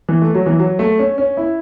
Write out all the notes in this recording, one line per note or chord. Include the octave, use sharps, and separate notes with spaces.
E3
A3
F#3
E3
F#3
A3
C#4
C#4
E4